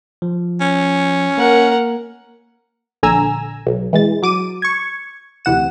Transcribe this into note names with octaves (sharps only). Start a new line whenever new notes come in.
F3
C#4
A#3 A#4 F#5
A#1 D3 G#5 A#5 E6
B1
E3 G#3 A6
F#3 D6 D#7
C#6 G#6
D2 C3 E3 F#5 E7